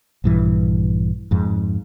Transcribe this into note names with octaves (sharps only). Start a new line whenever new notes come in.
A#1 G2 E3
F2 G#2